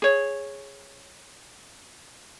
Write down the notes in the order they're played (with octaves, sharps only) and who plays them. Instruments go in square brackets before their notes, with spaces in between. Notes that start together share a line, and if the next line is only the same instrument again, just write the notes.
[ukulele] G#4 C#5